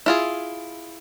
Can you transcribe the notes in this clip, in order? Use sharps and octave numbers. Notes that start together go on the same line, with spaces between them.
E4 F4 G#4